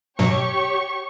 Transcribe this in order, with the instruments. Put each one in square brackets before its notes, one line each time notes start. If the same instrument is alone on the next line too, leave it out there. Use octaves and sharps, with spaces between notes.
[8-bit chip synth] G2 B2 F#3 [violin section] G4 C#5 C#6